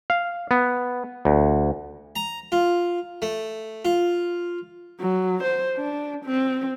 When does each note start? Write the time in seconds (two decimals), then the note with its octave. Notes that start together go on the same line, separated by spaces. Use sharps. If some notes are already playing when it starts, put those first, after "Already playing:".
0.10 F5
0.51 B3
1.25 D2
2.16 A#5
2.52 F4
3.22 A3
3.85 F4
5.00 F#3
5.43 C5
5.77 D4
6.25 C4